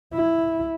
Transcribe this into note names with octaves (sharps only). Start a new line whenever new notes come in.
E4